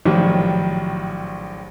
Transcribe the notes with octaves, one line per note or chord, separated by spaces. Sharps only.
A#1 A2 D#3 F#3 G3